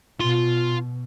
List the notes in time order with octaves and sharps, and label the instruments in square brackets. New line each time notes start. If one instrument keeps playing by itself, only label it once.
[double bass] B2 [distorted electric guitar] F4 C6